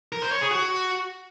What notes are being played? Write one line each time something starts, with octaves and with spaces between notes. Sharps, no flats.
A#4
C5
C#5
G#4
F#4